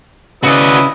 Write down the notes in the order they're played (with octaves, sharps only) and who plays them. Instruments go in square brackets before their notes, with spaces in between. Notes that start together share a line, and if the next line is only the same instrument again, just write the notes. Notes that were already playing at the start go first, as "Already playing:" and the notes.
[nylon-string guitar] C#3 [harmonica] E4 B4 D#5 [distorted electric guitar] F#4 D5